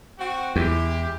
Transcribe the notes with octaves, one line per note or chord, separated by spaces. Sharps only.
C4 F#4
E2 G#3 E4 G4